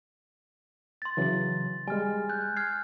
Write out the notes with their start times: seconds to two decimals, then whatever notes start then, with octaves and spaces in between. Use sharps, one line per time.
1.02 C6 A6
1.17 C#3 E3 F#3
1.88 G3 G#3 G#5 F6
2.29 F#6 G6
2.56 F6 G#6 C7